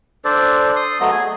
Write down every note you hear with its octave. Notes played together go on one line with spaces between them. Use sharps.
D4 A4 C5 D5
C6 D#6
F#3 A3 B3 D#5
G#4 G#5